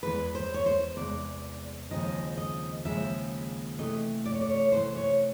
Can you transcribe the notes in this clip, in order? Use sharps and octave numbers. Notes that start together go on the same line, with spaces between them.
E2 C3 E3 G#3 B4
C5
C#5
C5
E2 C3 E3 G#3 D5
D#2 C#3 F3 G#3 C4 D#5
D#5
D#2 C#3 F3 G#3 C4 E5
C3 E3 A3 D#5
D5
C#5
D5
C#5
C3 E3 A3 C5
C#5